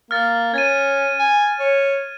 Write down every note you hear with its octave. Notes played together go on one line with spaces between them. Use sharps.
A#3 F6 A6
C#4 G#6 A6 D#7
G#5
C#5